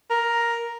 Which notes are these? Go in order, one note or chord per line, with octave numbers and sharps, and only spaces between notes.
A#4